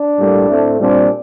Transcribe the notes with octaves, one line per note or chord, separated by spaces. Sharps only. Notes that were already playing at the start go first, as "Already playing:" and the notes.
Already playing: D4
A2 G3 A#3
A2 A3 C4
A#2 G3 C4 D4